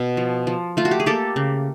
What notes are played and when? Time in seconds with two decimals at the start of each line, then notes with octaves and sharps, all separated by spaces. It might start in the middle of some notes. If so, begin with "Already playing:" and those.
Already playing: B2
0.17 F3
0.47 F3
0.77 A3 F4
0.85 F#4
0.91 G4
1.00 G#4
1.06 A#3 G4 A4
1.36 C#3